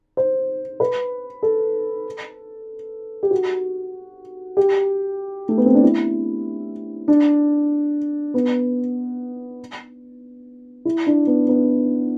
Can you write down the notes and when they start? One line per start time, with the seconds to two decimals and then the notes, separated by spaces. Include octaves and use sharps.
0.17 C5
0.80 B4
1.43 A4
3.23 G4
3.31 F#4
4.57 G4
5.49 A3
5.57 B3
5.66 C4
5.74 D4
5.83 E4
7.08 D4
8.34 B3
10.85 E4
11.07 D4
11.27 B3
11.48 B3